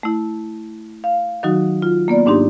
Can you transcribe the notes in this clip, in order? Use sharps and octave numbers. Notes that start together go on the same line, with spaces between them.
A3 E4
F5
D#3 F#3 D#4 F#4
F4
A#3 B3 D5
G#2 D4 D#4 G4 C6